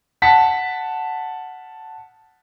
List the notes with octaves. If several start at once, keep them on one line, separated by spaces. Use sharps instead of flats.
F#5 A5 B6